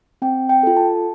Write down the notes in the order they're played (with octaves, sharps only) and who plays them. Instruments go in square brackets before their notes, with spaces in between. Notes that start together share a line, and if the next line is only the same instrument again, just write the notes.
[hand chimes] C4 G5
G5
F4 A4
A5